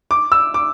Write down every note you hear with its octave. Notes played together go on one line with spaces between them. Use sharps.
D6
E6
D6